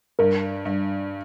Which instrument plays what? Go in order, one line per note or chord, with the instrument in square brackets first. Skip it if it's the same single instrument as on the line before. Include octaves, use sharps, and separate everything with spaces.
[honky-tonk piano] G2 [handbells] A#4
[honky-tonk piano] G2